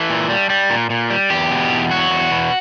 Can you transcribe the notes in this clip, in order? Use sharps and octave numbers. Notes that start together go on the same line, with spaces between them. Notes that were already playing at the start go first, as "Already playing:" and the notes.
Already playing: E3 A4
A#2
G3
G3
A#2
A#2
G3
E2 G4
B2
E2
F#3 F#4
E2
B2